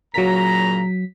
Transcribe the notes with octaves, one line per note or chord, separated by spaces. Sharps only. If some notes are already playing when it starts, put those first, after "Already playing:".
A#2 C#3 F#3 A#5 B6